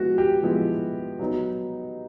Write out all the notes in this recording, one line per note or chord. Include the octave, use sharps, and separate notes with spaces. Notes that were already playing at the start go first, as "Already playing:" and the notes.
Already playing: F3 G#3 B3 E4 F#4
G4
F3 G#3 B3 E4
F#3 B3 D#4